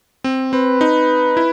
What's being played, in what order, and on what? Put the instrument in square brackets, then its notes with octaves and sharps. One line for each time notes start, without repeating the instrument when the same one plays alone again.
[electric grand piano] C4
[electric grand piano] C4 [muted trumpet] B4
[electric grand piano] D#4
E4